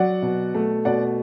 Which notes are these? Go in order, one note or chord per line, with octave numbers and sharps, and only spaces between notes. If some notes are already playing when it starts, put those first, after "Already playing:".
Already playing: F#3 D5 F#5
B2
A3
B2 D5 F#5